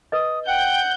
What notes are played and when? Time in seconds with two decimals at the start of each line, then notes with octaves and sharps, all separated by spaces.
0.12 B4 D#5 D#6
0.48 F#5 G5 G6